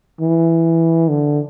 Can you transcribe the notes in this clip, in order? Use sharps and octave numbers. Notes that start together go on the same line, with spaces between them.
E3
D3